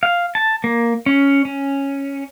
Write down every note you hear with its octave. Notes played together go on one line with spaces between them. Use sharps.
F5
A5
A#3
C#4
C#4